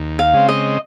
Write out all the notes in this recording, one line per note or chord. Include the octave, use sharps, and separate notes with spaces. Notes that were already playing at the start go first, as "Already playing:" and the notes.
Already playing: D#2
F5
C#3 G#3 C4
D#5